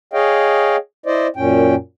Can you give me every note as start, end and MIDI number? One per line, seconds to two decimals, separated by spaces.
0.13 0.76 68
0.13 0.76 73
0.13 0.76 75
0.13 0.76 77
0.13 0.76 79
1.06 1.27 64
1.06 1.27 72
1.06 1.27 74
1.06 1.27 75
1.36 1.75 42
1.36 1.75 46
1.36 1.75 61
1.36 1.75 79